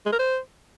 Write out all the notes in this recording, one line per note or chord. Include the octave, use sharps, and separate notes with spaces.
G#3
A#4
C5